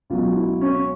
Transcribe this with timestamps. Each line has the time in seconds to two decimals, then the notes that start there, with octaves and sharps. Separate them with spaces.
0.10 C#2 B2 F#3 F4
0.36 E4
0.61 C#4